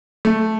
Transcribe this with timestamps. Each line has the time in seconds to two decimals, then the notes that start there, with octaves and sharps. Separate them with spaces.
0.25 A3